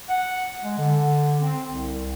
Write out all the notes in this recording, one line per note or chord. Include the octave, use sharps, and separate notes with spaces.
F#5
G#3
D3
C4
C2